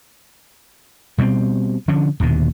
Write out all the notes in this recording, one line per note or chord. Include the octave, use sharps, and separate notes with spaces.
B2 G3 G#3 C4
D3 F3 C#4 D4
D#1 D#2 B2 D3